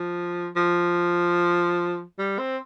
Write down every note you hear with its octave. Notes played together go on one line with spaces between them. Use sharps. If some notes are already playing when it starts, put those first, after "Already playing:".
Already playing: F3
F3
G3
C4